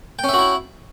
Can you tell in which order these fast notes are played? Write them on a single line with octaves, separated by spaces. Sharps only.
G5 C#4 E5 F#4 E4